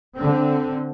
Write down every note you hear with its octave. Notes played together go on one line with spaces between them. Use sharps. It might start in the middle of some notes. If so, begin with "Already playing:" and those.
D3 C4